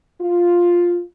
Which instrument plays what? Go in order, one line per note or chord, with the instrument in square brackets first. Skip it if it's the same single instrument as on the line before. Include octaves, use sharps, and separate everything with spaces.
[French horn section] F4